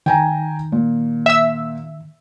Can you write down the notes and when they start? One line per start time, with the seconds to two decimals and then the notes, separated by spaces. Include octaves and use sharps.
0.06 D#3 G5 G#5 A#5
0.72 A#2
1.26 E5 E6